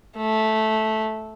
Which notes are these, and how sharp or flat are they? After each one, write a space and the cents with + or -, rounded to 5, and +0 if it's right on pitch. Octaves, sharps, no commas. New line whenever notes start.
A3 -10